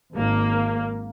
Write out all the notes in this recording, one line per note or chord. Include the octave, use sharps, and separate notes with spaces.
G#1 A#3